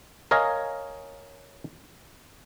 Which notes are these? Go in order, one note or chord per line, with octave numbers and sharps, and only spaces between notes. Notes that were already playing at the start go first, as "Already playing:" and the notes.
A#4 C#5 D#5 F5 G#5